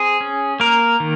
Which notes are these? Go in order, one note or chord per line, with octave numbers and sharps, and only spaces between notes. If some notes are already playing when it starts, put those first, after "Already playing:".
Already playing: C4 G#4
C#4
A#3 A#4
D#3